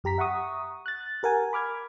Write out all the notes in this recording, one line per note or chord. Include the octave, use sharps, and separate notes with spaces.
F#2 G4 A#5 B6
E5 F#5 A#5 C#6 D#6
F#6 A6
G4 A#4 F#5 G#5
B5 D6 F6 G#6